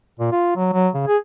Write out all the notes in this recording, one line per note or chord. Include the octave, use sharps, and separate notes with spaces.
A#2
F4
F#3
F#3
C#3
G#4